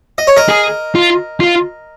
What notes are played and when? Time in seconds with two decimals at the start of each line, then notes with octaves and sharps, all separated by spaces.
0.18 D#5
0.27 C#5
0.37 A#4 D#5
0.49 G#4
0.95 F4
1.40 F4